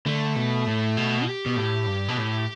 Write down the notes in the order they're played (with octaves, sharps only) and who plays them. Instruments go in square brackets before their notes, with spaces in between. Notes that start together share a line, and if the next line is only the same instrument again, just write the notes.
[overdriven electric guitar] D3 [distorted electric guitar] A3
[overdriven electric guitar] B2
A2
B2
[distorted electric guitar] G4
[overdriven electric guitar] B2
A2
G2
B2
A2